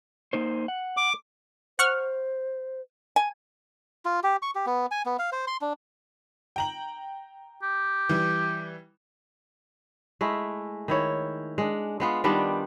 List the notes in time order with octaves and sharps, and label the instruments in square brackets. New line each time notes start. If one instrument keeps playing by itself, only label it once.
[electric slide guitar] A#3 D#4 C5
F#5
[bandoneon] D6
[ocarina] C5 [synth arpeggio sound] F#5 C#6 F6
[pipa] G#5
[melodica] F4
G4
C#6
G4
B3
G#5
B3
F5
C5
C6
D4
[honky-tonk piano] G5 A#5 F#7
[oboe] G4
[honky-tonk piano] E3 G3
[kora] G#3 A3 E4
D#3 E4 C#5
G#3 D4
G#3 B3 F4
D#3 G3 B3 D4